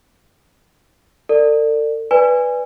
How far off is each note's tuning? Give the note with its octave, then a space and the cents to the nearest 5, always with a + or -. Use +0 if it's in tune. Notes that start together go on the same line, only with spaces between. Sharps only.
A4 +45 D5 +15
B4 +0 D5 +0 G#5 -15